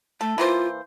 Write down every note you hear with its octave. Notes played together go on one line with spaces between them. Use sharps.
A3 A4
E3 A#3 F4 C5